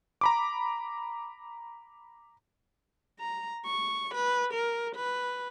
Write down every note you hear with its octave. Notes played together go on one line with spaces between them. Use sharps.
A#5 B5 D6
A#5
C#6
B4
A#4
B4